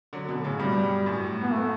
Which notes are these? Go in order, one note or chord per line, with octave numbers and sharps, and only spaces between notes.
D3 F#3
B2 D3
A2 C#3
G2 B2 G3
F#2 A2
B3
A3